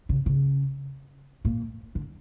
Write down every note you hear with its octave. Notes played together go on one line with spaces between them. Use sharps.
C#3
C#3
A#2
D3